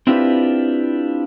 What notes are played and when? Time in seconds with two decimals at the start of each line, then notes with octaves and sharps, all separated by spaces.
0.07 C4 D4 E4 F4 G4 B4